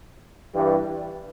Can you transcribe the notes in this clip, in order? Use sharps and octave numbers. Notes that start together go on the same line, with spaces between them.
G2 E3 G3